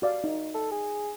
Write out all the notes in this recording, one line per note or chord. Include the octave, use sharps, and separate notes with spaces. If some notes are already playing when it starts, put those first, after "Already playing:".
F#4 D5 F5
D#4
A4
G#4